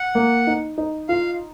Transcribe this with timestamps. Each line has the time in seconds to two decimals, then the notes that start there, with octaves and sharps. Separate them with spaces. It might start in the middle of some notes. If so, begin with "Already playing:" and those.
Already playing: F#5
0.15 A#3
0.47 D#4
0.78 D#4
1.09 F4 F5